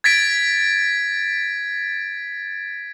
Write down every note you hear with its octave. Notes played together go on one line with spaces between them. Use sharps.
G#6 A6 B6 D7